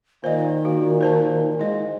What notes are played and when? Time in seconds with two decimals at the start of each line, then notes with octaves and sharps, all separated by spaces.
0.24 A#2 D#3 C5 D#5
0.65 A#2 F#4
1.01 A#4 C5 A5
1.59 G#2 G#3 E4 D#5